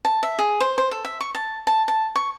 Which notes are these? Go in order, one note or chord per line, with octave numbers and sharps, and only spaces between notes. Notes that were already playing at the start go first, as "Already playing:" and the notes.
A5
E5
G#4
C5
C5
A4
E5
C#6
A5
A5
A5
C#6